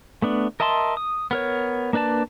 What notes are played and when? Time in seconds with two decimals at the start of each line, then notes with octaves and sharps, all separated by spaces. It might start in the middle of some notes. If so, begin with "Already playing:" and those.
0.22 A3 B3 D4
0.60 A#4 D#5 E5 A5 C6
0.97 D#6
1.31 B3 A#4 C#5
1.93 A#3 D4 B4 D5 A5